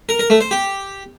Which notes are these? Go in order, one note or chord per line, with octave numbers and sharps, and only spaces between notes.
A#4
A#4
A3
C5
G4